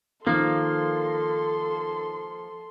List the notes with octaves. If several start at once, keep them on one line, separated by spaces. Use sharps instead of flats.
D#3 F3 A#3 A4 C6